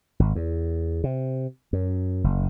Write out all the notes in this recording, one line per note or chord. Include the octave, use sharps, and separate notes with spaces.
G#1
E2
C3
F#2
F#1